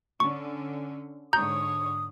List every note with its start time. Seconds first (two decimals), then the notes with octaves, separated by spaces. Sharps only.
0.20 D3 C#4 C#6
1.33 G#2 D3 C#5 A#5 D#6 G6